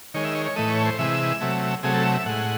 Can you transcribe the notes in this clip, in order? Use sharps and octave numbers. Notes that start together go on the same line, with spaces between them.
D#3 G#3 C#5
E5
C#5
C#5
A2 E3 A3 D#5
C#5
C5
C3 E3 G#3 E5
C3 F#3 A3
C3 F#3 A3 G#4
A4
E5
E5
A2 G#3 F#5